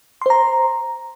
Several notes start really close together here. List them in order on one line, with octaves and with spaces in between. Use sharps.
C6 C5 A#5